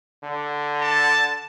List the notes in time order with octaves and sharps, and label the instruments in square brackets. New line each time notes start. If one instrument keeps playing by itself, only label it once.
[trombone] D3
[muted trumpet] A5